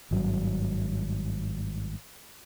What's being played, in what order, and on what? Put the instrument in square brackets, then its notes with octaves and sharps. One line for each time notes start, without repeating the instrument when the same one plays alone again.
[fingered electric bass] G#1 G2 F#3